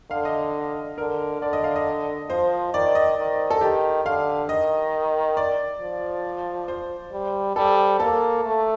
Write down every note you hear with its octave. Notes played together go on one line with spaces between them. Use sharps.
D3 F5
D#5
D3 A#4
D3 D5
D#5
F5
D#5
F3 C5
D#3 D5
D#5
D#3
A4
D#3 G4
D3 F5
D#3 D#5
D5
F3
C5
G3
G3 A4
A#3 A4
A3